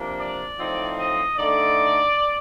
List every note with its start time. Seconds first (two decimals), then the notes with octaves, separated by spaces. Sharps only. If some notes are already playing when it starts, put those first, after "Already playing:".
Already playing: C3 F3 A#3 D4
0.19 D5
0.59 A2 F3 C4 D#4
0.98 D#5
1.37 D3 A3 D#4 D5